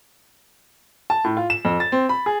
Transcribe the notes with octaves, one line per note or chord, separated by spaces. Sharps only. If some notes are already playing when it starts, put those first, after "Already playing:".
A5
A2
F4
E7
F2
A6
C4
B5
G#4